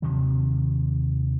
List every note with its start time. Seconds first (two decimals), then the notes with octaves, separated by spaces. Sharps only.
0.02 D#2 C3 D#3 F#3